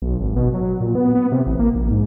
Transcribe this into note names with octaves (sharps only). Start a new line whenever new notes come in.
B1
G#1
B2
F#3
A#2
B3
B3
C3
A1
A#3
A#1
G#2